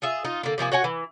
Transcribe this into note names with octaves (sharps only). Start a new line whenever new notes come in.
F4 G#4 E5
D#4 F4
D3 A#3
C3 F3 A#3 G#5
F#4 C#5 F#5 G#5
E3